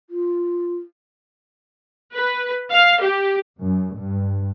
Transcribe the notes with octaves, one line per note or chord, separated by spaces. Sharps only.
F4
B4
F5
G4
F#2
G2